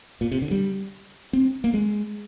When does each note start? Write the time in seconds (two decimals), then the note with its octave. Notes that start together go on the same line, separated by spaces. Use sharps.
0.21 A#2
0.32 C3
0.42 D3
0.51 G3
1.33 C4
1.64 A#3
1.74 G#3